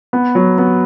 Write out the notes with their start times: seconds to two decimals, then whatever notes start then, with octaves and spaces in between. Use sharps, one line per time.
0.13 B3
0.35 F#3
0.58 B3